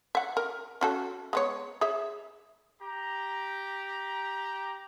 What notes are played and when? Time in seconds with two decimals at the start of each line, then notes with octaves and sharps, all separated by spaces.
0.15 E5 F#5
0.37 A#4
0.81 C#4 F#4 A4
1.33 G#3 B3 C#5
1.81 G#4 C#5 E5
2.82 G4 A#5